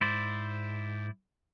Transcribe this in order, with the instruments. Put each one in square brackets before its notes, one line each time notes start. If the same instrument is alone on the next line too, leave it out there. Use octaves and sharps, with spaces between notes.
[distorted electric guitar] G#2 [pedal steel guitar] E4 C5 D5